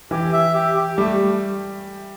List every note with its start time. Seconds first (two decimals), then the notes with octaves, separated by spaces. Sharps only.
0.11 E3 E4 G4
0.33 E5
0.54 G4
0.76 G4
0.98 G3 A3 G4